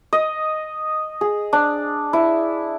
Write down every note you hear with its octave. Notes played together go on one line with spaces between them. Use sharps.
D#5
G#4
D4
E4